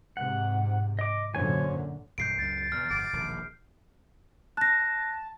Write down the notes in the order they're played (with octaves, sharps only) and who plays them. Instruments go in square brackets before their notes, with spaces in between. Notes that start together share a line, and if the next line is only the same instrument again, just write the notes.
[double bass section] G#2 C3 [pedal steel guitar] F#5
[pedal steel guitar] D#5 D6
[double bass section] F#2 A#2 D3 [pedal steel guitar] C5 C#5 G#5
[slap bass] B1 G2 E3 [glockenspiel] G6 C7 D7
[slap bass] C#2 F#2 [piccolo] A6
[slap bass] E2 C3 E3 [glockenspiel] F6
[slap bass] G1 F2 A2 [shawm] D6
[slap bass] E1 A#1 D#3
[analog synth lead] A5 [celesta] F#6 A#6